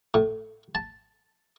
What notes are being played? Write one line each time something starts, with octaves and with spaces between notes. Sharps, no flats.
A2
A5